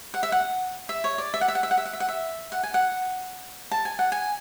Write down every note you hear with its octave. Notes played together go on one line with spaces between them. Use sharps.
F#5
E5
F#5
E5
C#5
D5
E5
F#5
E5
F#5
E5
F#5
E5
F#5
E5
F#5
E5
F#5
G#5
F#5
A5
G#5
F#5
G#5